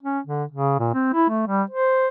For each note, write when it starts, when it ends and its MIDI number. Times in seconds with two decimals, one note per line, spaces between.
0.03 0.19 61
0.27 0.44 50
0.51 0.79 49
0.80 0.89 46
0.94 1.09 60
1.14 1.26 64
1.29 1.44 57
1.47 1.63 55
1.70 2.08 72